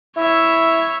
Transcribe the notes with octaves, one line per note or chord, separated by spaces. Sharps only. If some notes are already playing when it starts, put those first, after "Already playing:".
E4 C#5 E5